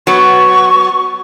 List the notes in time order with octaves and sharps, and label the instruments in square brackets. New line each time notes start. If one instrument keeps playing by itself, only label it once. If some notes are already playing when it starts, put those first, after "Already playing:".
[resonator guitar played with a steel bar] F#3 B3 [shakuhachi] C#6